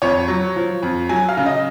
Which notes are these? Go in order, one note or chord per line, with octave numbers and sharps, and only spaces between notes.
F2 C#5
F#3
F3
F2
F#3 G#5
F5
C#3
D#5